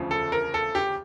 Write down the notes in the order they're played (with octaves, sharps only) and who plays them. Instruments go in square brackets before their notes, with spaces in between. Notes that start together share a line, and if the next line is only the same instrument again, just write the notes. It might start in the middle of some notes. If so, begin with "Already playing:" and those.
Already playing: [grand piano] E1 D2 C#3 F3
A4
A#4
A4
G4